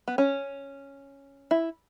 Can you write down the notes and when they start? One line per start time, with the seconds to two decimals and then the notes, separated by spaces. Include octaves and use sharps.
0.08 B3
0.18 C#4
1.51 E4